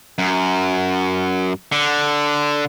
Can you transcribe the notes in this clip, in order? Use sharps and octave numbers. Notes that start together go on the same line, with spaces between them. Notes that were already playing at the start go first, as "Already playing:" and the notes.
F#2
D3